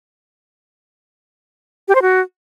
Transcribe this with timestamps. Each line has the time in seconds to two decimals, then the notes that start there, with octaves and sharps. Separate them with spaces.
1.88 G4
1.95 C5
2.02 F#4